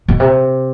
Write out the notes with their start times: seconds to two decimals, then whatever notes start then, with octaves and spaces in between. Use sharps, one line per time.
0.08 B2
0.20 C3